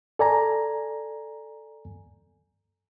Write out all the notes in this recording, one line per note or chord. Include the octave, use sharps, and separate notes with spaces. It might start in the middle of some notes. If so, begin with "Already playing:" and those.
A4 D5 G#5 A#5